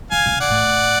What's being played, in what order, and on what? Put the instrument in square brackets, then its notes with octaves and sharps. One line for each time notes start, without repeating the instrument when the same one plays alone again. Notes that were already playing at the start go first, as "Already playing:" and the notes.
[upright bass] D3 [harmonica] F5 G#5
[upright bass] B2
C#3
[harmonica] D5 F#5
[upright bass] A2